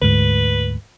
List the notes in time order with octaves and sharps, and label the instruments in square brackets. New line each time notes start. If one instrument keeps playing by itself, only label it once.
[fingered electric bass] D2 G#2 [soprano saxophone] B4